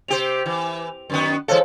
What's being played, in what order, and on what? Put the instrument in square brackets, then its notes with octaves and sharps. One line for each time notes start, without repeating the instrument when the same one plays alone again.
[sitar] C3 G4 C5 [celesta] F7
[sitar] E3
F#2 D#3 B3
[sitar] E3 G#3 A4 [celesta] C5 C#5 F5